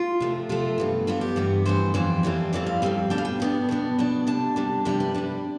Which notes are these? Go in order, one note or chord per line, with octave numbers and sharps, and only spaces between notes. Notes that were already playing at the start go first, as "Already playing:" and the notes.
Already playing: F4
C3 F3 A3
C3 F3 A3 F4
G2 E3 B3
G2 E3 B3 F4
G4
G2 E3 B3
G2 E3 B3 C5
F2 E3 G3 C4 C5
F2 E3 G3 C4
F2 E3 G3 C4 D5
F5
F2 E3 G3 C4
B2 B3 D4 G5
F5
G5
B2 B3 D4
B2 B3 D4
B2 B3 D4
C3 G3 D4 A5
C3 G3 D4
C3 G3 D4 G5
B4
C3 G3 D4